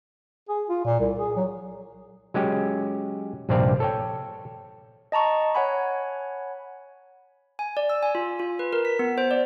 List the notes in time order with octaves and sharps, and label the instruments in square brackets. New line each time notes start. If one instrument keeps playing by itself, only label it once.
[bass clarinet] G#4
F4
A#2
C2
G#4
F#3
[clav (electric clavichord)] F#3 G#3 C#4 G4
A#1 G2 C3 C4 D5 F5
A4 C#5 G5
[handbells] D#5 A5 A#5 C#6
C#5 F#5 G#5 B5
G#5
D5
E6
G#5
F4
F4
B4
A#4
B6
B3
C5
D5